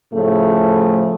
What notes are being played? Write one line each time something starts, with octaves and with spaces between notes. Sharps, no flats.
A2 C#3 F3 A3